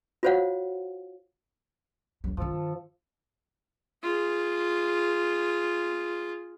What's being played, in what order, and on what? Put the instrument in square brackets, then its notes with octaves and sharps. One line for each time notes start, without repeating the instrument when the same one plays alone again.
[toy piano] F4 F#4 C5 C#5 F5 F#5
[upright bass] D#2 F#3
[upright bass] G2 D#3 [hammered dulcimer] F3 A4
[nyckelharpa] F4 G#4